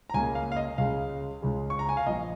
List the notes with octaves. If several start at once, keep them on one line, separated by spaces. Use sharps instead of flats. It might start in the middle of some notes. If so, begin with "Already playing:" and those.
A#5
C#2 C#3 A#3 G#5
F5
F5
D#5
C#2 C#3 G#3 F5
C#2 C#3 G#3
C#6
A#5
G#5
F5
A#1 A#2 F3 D#5